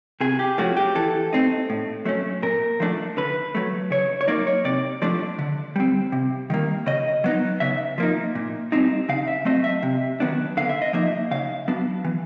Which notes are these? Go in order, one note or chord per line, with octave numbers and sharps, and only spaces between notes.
C3 G#4
G4
F3 A3 C#4 F#4
G4
E3 A4
A3 C4 D#4
A2
F#3 A3 C#4
A#2 A#4
F3 A3 D4
D3 B4
F#3 A3
C#3 C#5
C#5
F#3 A#3 D#4 D5
C#5
C3 D5
F3 A3 D4 D5
D3
G3 C4
C3
D#3 G3 A#3
C#3 D#5
F#3 B3 D#4
C#3 E5
F3 A#3 D#4
A#2
G3 C4 D#4
C#3 F5
E5
F#3 A3 C4 D#5
E5
C3
D#3 F#3 B3 D4
D3 F5
E5
D#5
F3 A#3 D#4 E5
C#3 F5
F#3 B3 D4
E3